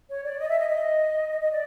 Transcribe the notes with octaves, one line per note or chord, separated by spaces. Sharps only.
C#5
D5
D#5
E5
D#5
D#5
D#5
D#5
D5